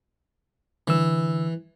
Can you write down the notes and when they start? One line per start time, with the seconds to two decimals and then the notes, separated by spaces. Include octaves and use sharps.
0.88 D3 E3 E6